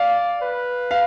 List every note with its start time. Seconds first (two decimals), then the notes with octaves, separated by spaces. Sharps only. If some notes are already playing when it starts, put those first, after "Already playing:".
Already playing: D5 F5
0.42 B4
0.91 F5